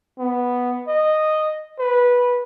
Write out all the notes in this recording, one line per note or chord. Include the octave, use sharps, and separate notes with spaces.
B3
D#5
B4